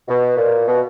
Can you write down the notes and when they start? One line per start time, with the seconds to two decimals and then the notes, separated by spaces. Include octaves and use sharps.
0.08 B2
0.37 A#2
0.67 B2